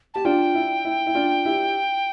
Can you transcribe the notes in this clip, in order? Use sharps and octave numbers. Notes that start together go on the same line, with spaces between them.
G4 A5
D4 F4 G5
E4
E4
E4
D4 F4
E4 G4